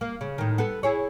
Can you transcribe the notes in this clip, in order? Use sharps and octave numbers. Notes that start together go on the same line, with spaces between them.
A#3
C#3
A2 D#3
B3 A4
E4 G#4 C#5